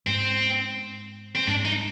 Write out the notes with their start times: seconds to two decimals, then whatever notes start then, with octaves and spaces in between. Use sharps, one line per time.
0.07 G#2 C4
1.35 C4
1.47 G#2 D4
1.65 D#4